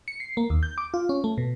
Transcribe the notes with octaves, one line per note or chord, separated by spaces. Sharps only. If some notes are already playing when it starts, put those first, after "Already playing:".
C#7
C7
A#3
D#2
G6
D6
F4
C#4
A3
B2